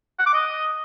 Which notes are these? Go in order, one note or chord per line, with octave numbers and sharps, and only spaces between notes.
F#5
D6
D#5